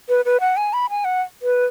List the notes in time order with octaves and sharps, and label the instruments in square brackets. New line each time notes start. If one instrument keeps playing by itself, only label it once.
[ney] B4
B4
F#5
G#5
B5
G#5
F#5
B4